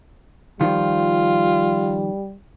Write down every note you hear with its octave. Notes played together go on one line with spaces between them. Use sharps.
D#3 F3 G3 F4